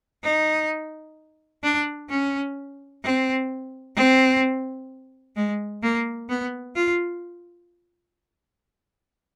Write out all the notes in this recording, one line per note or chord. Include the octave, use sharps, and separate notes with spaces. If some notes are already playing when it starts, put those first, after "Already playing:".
D#4
D4
C#4
C4
C4
G#3
A#3
B3
F4